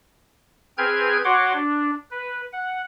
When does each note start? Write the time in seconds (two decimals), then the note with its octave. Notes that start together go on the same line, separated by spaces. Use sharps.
0.78 C4 G#4 B4 G5 F6 G#6
1.25 F#4 C#5 F#5 C6 D6
1.53 D4
2.11 B4
2.53 F#5